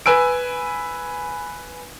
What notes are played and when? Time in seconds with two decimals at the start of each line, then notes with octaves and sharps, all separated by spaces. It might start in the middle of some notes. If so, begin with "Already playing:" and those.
0.06 B4 G#5 E6 D7